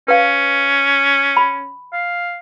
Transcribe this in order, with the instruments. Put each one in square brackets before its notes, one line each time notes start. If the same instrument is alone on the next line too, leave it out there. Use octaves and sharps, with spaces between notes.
[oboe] C#4 [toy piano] B4 F5
[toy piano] B5
[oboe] F5